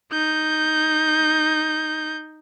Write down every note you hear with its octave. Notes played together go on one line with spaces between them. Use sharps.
D#4 G6